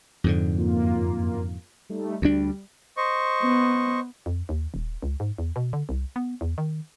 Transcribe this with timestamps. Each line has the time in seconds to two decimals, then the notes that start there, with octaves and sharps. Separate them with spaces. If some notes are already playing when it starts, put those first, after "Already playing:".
0.24 F2 G#2 D3
0.58 F#2 A#3 F4
1.89 G3 A3 D#4
2.22 D2 G3 D4
2.97 C5 D#5 C#6
3.43 B3
4.26 F2
4.49 D#2
4.74 D#1
5.02 C#2
5.20 G#2
5.38 E2
5.56 B2
5.73 D3
5.89 C2
6.16 B3
6.41 E2
6.58 D#3